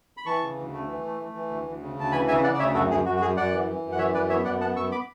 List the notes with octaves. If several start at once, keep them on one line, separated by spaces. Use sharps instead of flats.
B5
E3 A5 C#6
C#3
D2
A3
E3
A3
A3
E3
D2
D2
C#3
D2 A5
E3 G#5 B5
C#3 E5 G#5
C#3 D5 F#5
D5
D2 C#5 E5
F#2 F#4 A4
F#2 G#4
F#2 F#4
F#4
F#2 G#4
F#2 D5 F#5
E3
E3
F#2
F#5
E3 C#5 E5
F#2 B4 D5
B3 C#5 E5
F#2 D5 F#5
B3 F#5 A5
F#2 C#6 E6
B5 D6